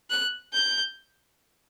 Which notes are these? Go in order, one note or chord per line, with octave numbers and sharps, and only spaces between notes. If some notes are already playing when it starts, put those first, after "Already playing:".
F#6
G6